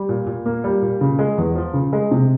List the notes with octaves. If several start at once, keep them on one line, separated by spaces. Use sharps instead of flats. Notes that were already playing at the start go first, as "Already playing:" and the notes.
Already playing: G3
A#2
A#2
A#3
G3
A#2
C#3
G#3
E2
F3
C#3
G#3
C3